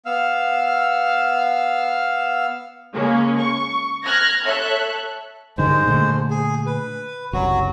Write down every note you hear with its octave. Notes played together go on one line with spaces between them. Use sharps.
B3 F5 E6 F6
C#3 G#3 A#3 C#4
C#6
F6 F#6 G#6 A#6
A4 C#5 E5 F#6
G2 D3 D#3 G#3 C5
A#2 D3 A3
G#4
B4
F#1 C2 F#3 F#4